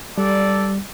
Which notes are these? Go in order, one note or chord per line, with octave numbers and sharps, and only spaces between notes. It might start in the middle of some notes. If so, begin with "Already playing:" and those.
G3 A4 D5